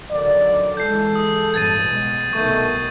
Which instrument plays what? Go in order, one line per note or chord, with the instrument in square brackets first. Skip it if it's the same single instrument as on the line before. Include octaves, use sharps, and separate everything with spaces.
[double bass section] D3 D#3 F#3 [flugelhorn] D5
[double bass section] E3 G#3 [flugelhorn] A4 [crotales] G6 C7
[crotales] D#6
[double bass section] A1 G2 B3 [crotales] G#6 A6 D#7
[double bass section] B2 G#3
[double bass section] C2 B2 D#3 [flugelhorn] A3 [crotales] C#6 G6